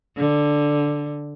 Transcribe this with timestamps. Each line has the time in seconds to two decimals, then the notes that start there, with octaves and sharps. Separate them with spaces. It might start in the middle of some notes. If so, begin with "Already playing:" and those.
0.17 D3